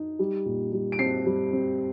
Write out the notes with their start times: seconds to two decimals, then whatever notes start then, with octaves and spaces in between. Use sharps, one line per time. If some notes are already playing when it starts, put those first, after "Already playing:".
Already playing: D#4
0.19 G3
0.46 A#2
0.72 G3
0.92 D7
0.99 C4 C7
1.26 G3
1.53 C4